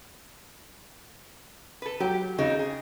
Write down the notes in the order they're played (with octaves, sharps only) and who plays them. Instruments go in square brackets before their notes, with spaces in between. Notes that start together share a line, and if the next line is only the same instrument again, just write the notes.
[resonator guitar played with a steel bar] A4 B4
[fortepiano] F#3 [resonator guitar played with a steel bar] G4
[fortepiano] C#3 [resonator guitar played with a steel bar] E3 C4 D#4
[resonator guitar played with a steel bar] G#4